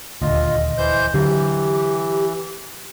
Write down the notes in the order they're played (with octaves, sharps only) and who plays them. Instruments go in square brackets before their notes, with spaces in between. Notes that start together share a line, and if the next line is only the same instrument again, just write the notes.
[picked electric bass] D#1 D2 [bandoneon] F4 [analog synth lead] D#5
[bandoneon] E3 C5 G6
[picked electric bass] D3 F#3 [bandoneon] E3 [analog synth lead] G4